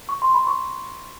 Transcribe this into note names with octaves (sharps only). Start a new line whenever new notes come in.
C#6
C6
B5
C#6